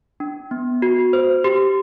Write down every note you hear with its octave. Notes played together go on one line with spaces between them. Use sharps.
D4
B3
F#4
C5
G4